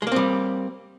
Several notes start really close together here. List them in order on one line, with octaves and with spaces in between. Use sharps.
G#3 A#3 C4 G3